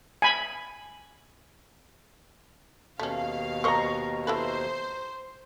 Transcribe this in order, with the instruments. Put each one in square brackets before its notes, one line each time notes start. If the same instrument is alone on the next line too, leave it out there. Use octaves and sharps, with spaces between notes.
[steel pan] G#5 B5
[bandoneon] D#2 B2 [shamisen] A3 C#4 [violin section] F5
[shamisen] A#4 C5 D#5 [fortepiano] A#5 C#6
[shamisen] E4 A4 B4 [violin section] C5